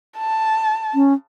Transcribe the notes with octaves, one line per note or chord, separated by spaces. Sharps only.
A5
C#4